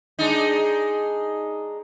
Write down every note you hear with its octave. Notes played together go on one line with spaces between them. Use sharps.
G#3 D4 D#4